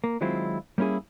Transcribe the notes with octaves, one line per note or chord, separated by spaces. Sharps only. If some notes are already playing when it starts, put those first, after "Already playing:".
A#3
D#3 F#3 G#3 C4 E4 F4
G3 A#3 C#4 E4 G#4